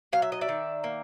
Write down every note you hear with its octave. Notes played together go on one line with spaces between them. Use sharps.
F#3 F5
E5
D#5
D5 E5
D#3
A#3